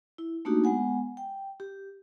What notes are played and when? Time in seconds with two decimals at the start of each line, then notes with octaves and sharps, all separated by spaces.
0.18 E4
0.45 A3 A#3 D4 D#4 F#4 G4
0.64 G#3 B3 F#5 G#5
1.17 G5
1.60 G4